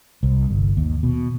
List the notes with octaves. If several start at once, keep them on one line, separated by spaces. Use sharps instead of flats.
C2
G1
D#2
B2